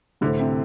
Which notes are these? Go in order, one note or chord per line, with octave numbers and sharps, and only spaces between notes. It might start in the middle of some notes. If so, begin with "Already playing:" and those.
A2 D3 A3 E4 C5
C3